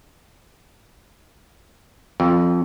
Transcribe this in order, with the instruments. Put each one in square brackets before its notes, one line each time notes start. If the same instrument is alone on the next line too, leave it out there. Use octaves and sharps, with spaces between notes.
[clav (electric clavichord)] F2